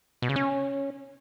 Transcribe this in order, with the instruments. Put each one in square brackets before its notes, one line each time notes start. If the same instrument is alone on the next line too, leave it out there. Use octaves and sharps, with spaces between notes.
[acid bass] B2
C#3
C#4